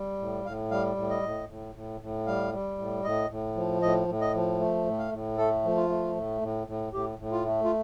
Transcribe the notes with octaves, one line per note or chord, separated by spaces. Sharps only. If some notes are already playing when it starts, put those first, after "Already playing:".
Already playing: G3
A2
A2 F5
G3 F5
A2
D#5
A2
A2
A2
A2
G3 F5
G3
A2
A2 D#5
A2
F3
A2 D#5
A2
D#5
F3
A3
A2
F5
A2
A3 A4
F3
F4
A3
A2
A2
A2
A2 G4
A2
F4
A3
F4